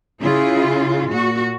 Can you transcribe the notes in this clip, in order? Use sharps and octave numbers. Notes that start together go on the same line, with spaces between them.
C#3 E4 F4 G#4
A#2 F#4